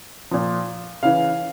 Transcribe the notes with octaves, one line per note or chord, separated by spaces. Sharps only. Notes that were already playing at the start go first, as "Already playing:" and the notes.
A#2 F3
C#3 E3 F5